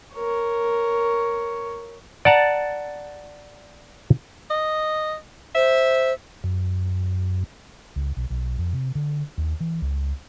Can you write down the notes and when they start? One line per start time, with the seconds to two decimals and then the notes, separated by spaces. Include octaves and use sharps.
0.14 A#4 C#5
2.25 D5 F#5 A5 A#5
4.50 D#5
5.55 C5 E5
6.44 F#2
7.96 C#2
8.17 B1
8.30 B1
8.58 F2
8.73 C3
8.95 D3
9.38 D#2
9.60 E3
9.82 C#2